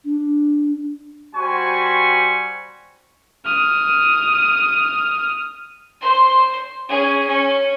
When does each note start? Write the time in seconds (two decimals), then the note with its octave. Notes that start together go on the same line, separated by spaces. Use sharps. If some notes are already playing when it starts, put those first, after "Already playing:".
0.05 D4
1.35 G3 F#4 C5 G#5 B5 C#6
3.45 D#6 F6
6.01 C5 C6
6.88 C#4 G#4
7.27 C#4